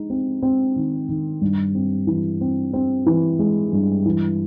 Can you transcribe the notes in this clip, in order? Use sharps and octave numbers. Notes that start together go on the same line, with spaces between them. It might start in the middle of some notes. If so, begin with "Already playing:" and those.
Already playing: G#3 D#4
C4
C4
D#3
D#3
G2
C4
E3
C4
C4
E3
G#3
G2
E3